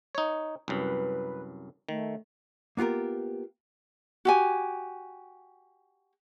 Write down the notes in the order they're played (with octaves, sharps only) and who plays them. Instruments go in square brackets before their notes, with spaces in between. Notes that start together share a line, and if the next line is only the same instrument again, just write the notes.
[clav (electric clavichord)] D#4 C#5
[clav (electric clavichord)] C2 F#2 [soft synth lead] B4
[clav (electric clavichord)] D#3 [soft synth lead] A3
[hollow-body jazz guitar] A#3 B3 F4 G4 A#4
[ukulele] F#4 G4 G#5